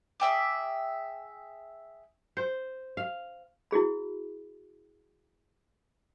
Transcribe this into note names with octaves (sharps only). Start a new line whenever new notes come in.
G#4 E5 G5 D6
C5
F5
E4 F#4 G#4 B5